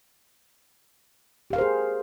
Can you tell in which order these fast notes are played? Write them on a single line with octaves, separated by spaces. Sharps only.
G4 F5 A#4 C5 G#4